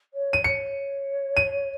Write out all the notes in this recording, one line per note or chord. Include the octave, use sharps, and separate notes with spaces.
C#5
D#7
C#5 C#7
D#7